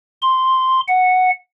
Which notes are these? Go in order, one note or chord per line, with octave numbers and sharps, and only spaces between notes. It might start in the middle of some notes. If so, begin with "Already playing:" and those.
C6
F#5